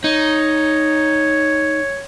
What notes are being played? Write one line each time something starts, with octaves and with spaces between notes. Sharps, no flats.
D#4 C#5